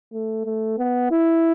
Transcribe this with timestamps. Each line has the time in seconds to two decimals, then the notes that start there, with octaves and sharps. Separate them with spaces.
0.13 A3
0.45 A3
0.78 B3
1.11 E4